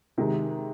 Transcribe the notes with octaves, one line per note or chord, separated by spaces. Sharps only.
C3 D#3 G#3